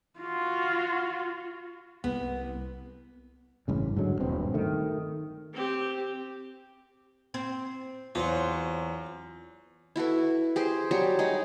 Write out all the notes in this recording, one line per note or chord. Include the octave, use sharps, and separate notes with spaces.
F4 F#4
C2 B3
A1 G2 C#3
G#2 D3 F#3 G#3
D#1 G2 B2 C4
D#3 A3
C4 G4
C4
E2 F#3 F4 C5 C#5
E4 F#4 A4 B4
G4 G#4 C5
F#3 G3 G4 C#5
G#3 D#4 G#4